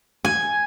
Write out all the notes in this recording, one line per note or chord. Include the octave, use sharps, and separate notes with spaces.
G#5